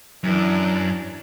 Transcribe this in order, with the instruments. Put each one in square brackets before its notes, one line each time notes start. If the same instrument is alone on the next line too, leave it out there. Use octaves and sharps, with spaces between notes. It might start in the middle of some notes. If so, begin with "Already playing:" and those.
[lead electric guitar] F#2 [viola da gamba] E3 D4